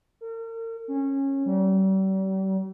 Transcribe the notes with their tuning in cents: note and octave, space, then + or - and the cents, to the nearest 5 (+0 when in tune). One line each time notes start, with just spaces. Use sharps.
A#4 -40
C#4 -20
G3 -40